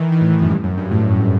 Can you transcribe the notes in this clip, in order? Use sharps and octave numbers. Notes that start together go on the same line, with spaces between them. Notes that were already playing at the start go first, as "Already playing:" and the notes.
Already playing: D#3 E3
E3
A2
F#2
G2
F#2
G2
A2
G2
F#2